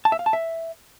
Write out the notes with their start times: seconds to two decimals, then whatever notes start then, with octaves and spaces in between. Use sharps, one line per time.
0.05 A5
0.12 E5
0.19 F5
0.26 A5
0.33 E5